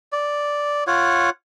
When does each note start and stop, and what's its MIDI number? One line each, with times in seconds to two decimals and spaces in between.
0.12 0.84 74
0.87 1.30 65
0.87 1.30 73
0.87 1.30 78